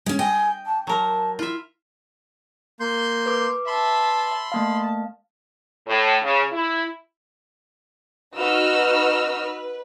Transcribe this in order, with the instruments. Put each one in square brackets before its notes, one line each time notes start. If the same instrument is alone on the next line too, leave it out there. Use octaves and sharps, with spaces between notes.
[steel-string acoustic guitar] G#3 C#4
[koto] D#5 [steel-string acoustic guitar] G5 [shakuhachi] G#5
[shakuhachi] A5
[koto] F#3 A#4 [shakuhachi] A5
[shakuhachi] E4 [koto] F4 E5
[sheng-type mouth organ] A#3 C6 G6
[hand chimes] B4 D6
[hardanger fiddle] E5 A5 [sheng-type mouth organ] B5 C6
[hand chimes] A3 A#3 F5 [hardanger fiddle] A5
[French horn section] A2
C#3
E4
[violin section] D#4 F#4 B4 D#5 E6 F6
B4